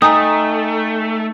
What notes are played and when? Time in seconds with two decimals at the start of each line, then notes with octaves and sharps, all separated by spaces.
0.02 A3 D#4 G5 G#5 A#5 D#6